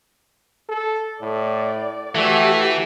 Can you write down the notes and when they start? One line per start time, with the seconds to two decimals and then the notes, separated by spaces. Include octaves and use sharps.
0.69 A4
1.21 A2 D5
2.15 E3 A3 F#4 G4